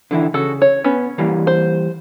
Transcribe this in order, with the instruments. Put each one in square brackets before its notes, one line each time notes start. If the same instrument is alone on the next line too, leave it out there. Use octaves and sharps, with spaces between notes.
[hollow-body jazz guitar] D3 E3 E4
[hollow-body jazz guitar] C#3 [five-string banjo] F#4 A4
[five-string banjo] C#5
[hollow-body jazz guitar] B3 [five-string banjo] C#4
[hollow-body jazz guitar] E3 G3 A#3
[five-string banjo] C5